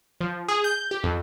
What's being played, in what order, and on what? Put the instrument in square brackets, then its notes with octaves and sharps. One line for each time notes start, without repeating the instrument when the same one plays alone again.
[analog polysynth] F3
G#4
G6
G4
F2